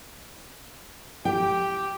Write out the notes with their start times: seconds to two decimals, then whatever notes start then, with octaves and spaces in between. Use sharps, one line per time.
1.25 G4 G5